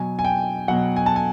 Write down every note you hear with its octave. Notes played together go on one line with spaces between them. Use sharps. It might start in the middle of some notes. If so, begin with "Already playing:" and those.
Already playing: B2 F#3 G#5
G#5
G5
B2 F#3 F#5
G#5
A5
G#5